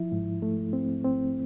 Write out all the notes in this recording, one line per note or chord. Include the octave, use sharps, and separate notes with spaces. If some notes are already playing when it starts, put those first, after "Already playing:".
Already playing: F3 E4
G#2
A3
C4
C4